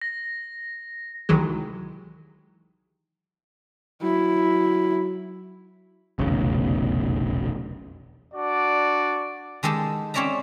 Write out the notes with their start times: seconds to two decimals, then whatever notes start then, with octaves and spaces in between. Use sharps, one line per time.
0.02 A#6
1.29 C2 D#3 E3 F#3 G#3
4.03 F#3 E4
6.19 F1 B1 E2 C#3
8.34 D4 F#4 D5
9.63 D#3 G#3 G4 A4
10.14 C4 C#4 C#5 D5 E5 A#5